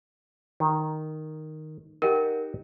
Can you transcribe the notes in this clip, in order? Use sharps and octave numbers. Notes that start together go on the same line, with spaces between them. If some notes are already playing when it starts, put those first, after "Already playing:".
D#3
D#4 F#4 G4 A#4